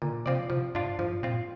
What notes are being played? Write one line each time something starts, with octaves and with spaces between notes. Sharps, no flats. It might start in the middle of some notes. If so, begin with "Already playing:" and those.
A#2 D3
C3 F3 C4 F4 D5
C3 F3
G2 D4 F4
G2 F3
A#2 C4 F4